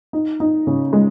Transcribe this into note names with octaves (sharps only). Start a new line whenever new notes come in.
D#4
D#4
C#3
G#3